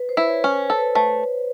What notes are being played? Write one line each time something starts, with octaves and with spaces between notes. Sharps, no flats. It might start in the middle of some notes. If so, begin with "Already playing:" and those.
Already playing: B4
C5
E4
C#5
C#4
A4
B4
A3